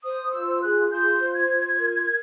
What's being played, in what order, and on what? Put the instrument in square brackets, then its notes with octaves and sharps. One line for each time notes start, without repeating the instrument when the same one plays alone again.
[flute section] C5 D#6
F4 E6
G#4 F#6
F4 G6
C5
G#6
F4
A#4